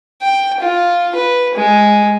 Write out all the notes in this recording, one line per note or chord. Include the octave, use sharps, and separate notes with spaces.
G5
F4
B4
G#3